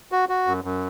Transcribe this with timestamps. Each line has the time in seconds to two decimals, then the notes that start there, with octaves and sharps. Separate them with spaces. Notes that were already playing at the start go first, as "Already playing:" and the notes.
0.12 F#4
0.29 F#4
0.47 F#2
0.64 F#2